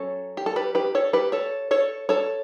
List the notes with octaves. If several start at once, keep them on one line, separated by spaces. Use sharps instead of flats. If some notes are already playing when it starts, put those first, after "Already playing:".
Already playing: F#3 C#4 A4 C#5
G4
A4
G4 B4
G4 B4
A4 C#5
G4 B4
A4 C#5
A4 C#5
A4 C#5